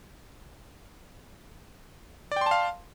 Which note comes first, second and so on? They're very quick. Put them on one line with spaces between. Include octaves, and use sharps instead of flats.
D5 G5 C6 A5 F5